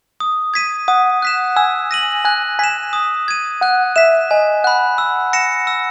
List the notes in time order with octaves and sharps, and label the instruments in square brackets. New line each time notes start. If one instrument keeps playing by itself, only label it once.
[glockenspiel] D#6
G#6 B6 D#7
[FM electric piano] F#5 [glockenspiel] D#6
[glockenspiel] F#6 B6 E7
[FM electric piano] G#5 [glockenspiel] E6
[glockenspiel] A#6 D#7 F#7
[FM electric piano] G#5 [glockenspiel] F#6
[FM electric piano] G#5 [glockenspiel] B6 E7
[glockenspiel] D#6
G#6 D#7
[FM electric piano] F#5 [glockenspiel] F#6
[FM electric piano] E5 [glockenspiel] B6 E7
[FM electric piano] D#5 [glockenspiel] G#5
[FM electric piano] F#5 [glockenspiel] B5 F#6
[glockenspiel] E6
A#6 C#7 E7
E6